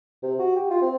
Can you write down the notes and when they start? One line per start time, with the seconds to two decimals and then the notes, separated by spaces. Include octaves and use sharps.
0.23 C3
0.39 F#4
0.56 G4
0.71 F4
0.82 C4